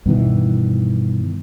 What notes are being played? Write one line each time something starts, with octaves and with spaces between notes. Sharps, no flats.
G2 B2 D#3 E3